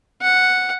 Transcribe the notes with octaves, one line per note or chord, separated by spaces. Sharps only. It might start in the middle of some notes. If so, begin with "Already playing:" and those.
F#5